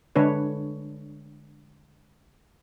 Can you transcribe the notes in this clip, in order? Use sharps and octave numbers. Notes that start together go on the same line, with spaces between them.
D3 G#3 D4 B4 C#5